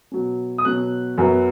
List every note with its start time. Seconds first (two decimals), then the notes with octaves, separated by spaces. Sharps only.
0.12 B2 F#3 C#4
0.58 D#6
0.65 B2 F#3 C#4 F#6
1.18 F#2 F#3 B3